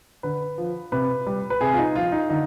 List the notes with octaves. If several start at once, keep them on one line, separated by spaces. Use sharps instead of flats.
D3 B4
F3
C3 B4
G3
B4
C3 G#4
F4
D#4
F3 F4
D#4
D3 D#4